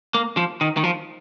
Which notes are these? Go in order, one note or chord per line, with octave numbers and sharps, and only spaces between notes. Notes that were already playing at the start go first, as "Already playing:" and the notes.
A#3
F3
D#3
D#3
F3